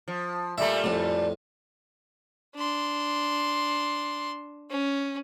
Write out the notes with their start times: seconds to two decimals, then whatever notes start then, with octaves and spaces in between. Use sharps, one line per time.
0.08 F3
0.58 A#2 G3 A3 E5 B5
0.84 F2 A2
2.56 D4 C6
4.71 C#4